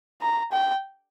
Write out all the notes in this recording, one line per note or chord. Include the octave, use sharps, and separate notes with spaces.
A#5
G5